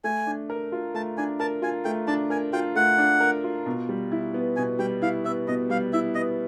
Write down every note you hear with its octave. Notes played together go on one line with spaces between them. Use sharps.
A3 G#5
D4
A#4
F4
A3 A5
D4 G#5
A#4 A5
F4 G#5
A3 G5
D4 A5
A#4 G#5
F4 G5
A3 F#5
D4
A#4
F4
B2
G3
E4
B3
B2 G#5
G3 G5
E4 F5
B3 E5
B2 D#5
G3 F5
E4 E5
B3 D#5